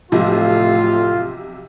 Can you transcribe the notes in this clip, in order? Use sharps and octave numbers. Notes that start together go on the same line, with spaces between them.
B1 A2 C3 F3 F4